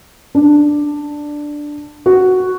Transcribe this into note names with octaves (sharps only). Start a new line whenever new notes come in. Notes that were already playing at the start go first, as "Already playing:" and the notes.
D4
F#4